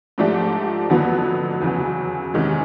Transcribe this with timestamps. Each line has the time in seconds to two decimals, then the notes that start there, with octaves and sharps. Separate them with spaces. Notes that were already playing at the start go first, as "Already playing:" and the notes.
0.18 G#2 F3 A3 D4 G4
0.90 F2 D3 F#3 B3
1.61 E2 C#3 F#3
2.34 E2 C3 D#3 G#3 C#4